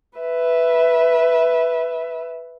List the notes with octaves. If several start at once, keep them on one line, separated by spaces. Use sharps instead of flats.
B4 E5